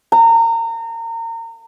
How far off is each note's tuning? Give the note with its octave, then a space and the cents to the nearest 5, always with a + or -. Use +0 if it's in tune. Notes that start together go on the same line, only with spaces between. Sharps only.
A#5 -30